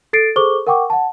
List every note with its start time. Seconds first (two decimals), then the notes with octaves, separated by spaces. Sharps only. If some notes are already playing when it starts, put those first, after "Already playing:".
0.13 A4 A6 C7 D7
0.36 G#4 A4 C5 C#6 D6 G7
0.67 A#4 F#5 G5 C#6 D6
0.90 F#5 A5